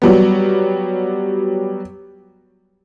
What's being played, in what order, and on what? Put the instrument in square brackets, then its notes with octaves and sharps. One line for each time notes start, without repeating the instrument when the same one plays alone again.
[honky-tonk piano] F#3 G3 B3